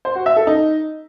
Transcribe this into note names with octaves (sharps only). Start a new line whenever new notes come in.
C5
F#4
E5
A4
D#4